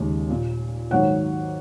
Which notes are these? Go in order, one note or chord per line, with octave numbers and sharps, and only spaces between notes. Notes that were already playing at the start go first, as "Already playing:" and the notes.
Already playing: D#2 C#3 G#3
A#2 A#3
G#2 D#3 F#3 A#3 C#5 F#5